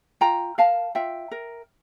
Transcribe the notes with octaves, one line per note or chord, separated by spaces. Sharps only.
F4 G5 A#5
A#4 F5 A5
F4 E5 G5
A#4